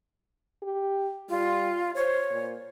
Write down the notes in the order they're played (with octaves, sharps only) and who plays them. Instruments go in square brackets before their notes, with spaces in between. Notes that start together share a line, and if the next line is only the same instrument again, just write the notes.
[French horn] G4
[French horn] G3 [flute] F4
[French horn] C5 [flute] C#5
[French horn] A#2